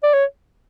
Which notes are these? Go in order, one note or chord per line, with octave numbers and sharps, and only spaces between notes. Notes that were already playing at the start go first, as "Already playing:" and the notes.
D5
C#5